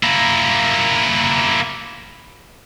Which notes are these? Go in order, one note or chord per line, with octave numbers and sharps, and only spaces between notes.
A#3 E4